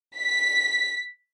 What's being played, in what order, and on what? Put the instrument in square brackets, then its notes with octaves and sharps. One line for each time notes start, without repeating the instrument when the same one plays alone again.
[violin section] B6